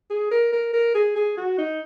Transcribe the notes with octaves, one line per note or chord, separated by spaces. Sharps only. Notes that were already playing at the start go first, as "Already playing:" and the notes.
G#4
A#4
A#4
A#4
G#4
G#4
F#4
D#4